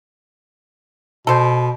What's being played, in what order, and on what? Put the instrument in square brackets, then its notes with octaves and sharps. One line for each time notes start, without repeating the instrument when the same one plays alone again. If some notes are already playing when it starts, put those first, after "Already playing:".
[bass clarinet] B2 [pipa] A4 C5